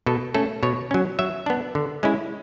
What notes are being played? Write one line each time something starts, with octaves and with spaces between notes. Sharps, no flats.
B2 A4
A3 C#4 A4
B2 C#5
F#3 C#4
F#3 E5
B3 D4
D3
G#3 C#4 E4